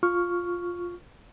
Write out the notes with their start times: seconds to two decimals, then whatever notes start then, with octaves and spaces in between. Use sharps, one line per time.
0.03 F4 C#6 F6